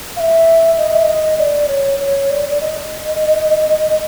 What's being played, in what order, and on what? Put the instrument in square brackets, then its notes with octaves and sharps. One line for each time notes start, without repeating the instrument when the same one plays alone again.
[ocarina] F5
E5
D#5
E5
D#5
D5
C#5
C#5
D5
D5
D#5